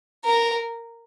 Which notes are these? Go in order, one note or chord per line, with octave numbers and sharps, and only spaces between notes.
A#4